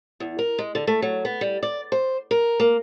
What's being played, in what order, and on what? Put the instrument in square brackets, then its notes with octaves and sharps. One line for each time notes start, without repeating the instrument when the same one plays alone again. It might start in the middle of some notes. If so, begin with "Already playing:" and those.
[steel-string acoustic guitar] E2
A#4
G#3
D3
A3
F#3
B3
G3
D5
C5
A#4
A#3